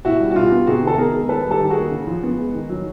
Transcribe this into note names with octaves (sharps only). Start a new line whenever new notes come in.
B2 E4 F#4
G3
F#4
B2 F4 G4
B3
C3 F#4 G#4
D#3 A4
B3 G#4 A#4
G#3
D#3 A4 B4
G3
G4 A4
D#3
F#4 G#4
A#3
C#3
F3
B3
G#3
D#3
F#3